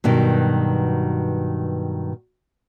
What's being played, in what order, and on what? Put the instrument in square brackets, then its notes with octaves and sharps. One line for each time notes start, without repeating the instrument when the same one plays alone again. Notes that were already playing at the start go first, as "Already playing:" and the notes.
[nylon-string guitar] G2 B2 D#3 F#3